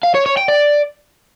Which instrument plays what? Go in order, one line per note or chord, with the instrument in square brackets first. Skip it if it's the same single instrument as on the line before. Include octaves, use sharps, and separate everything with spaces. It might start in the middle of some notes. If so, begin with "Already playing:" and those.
[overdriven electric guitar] F5
C#5
C#5
G5
D5